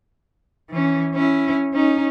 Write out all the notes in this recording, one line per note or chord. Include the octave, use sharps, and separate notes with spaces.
E3 C#4
C#4 E4
C#4 D#4